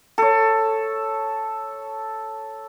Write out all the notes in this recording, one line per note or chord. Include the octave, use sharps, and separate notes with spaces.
A4 C#5